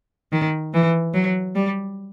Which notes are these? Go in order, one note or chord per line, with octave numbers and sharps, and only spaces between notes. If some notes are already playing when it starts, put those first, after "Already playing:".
D#3
E3
F#3
G3